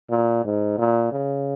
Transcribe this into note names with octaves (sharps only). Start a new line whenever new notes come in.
A#2
G#2
A#2
C#3